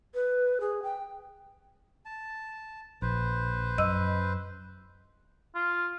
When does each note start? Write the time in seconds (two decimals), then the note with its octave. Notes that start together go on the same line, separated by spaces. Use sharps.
0.14 B4
0.61 G#4
0.83 G5
2.05 A5
3.02 A#1 B4 C5
3.78 F#2 D#5 E6
5.55 F4